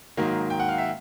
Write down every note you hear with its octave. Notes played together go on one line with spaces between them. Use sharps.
G#2 D#3 F#3 A#3
G5
F#5
F5
E5